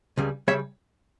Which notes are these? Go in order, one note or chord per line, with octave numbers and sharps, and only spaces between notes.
C#2 C#3 G3
C#3 G3 C#5 E5